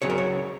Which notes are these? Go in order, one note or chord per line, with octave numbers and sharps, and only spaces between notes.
C#2 C#3 F#3 C#5
A#4
C#5